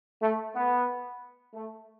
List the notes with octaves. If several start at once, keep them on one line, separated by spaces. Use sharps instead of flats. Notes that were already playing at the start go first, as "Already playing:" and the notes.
A3
B3
A3